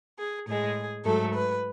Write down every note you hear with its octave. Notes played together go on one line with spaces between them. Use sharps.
G#4
A2 G#3 G#4
G#2 F#3 A3 A4
B4